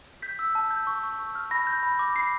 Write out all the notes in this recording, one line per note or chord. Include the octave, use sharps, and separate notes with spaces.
G6 B6
E6
A5
G6
C#6
C#6
C#6
F6
B5 A#6
G6
B5
D6
B5 C7